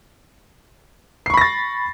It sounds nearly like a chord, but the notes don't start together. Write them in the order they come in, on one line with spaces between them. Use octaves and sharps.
C7 C#6 B5 A#6 A6